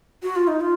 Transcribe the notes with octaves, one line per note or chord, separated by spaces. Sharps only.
F#4
F4
D#4
F4